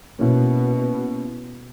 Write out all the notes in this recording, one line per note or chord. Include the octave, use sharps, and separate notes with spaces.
B2 A#3 C#4 E4